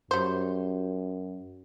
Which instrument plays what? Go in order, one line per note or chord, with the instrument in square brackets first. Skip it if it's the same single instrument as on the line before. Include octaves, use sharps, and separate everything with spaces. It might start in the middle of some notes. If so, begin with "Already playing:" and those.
[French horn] F#2 [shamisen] G3 C5